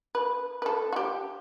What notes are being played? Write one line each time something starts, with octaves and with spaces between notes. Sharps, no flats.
B4
B4
A4
F#4
G4